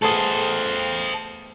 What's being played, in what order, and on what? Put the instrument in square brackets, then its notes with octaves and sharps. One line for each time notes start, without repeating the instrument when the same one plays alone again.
[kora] A3 B3 G#4 [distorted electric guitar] A4 C5